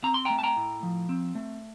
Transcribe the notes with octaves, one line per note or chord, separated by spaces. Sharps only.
C4 A#5
C6
A3 G5 A#5
A5
G5 A#5
A2
F3
C4
A3